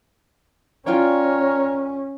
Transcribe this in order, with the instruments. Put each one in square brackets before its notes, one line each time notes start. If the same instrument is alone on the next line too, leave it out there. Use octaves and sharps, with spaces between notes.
[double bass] C#4 [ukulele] F4 D5 G5 [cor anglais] A#4 [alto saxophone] C#5